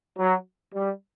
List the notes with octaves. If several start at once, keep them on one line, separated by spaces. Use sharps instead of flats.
F#3
G3